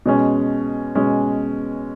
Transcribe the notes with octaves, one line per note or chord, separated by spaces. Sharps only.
B2 G#3 C#4
B2 G#3 C#4